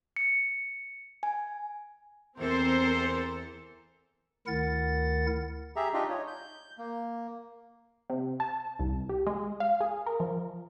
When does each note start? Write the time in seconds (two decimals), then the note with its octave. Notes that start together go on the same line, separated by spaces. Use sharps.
0.16 C#7
1.23 G#5
2.38 E2 E3 C4 A4 A#4 C5
4.47 D2 D#3 E4 A#4 F#5 A6
5.76 G4 G#4 E5 A#5
5.94 D4 D#4 F4 G4 D#5
6.09 C#5
6.27 G6
6.78 A#3
8.10 C3
8.40 A5
8.79 C2
9.09 G4
9.27 G#3
9.60 F5
9.81 G#4
10.06 A#4
10.20 F3